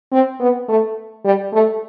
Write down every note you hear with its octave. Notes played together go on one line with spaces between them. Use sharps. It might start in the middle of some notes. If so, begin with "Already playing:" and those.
C4
B3
A3
G3
A3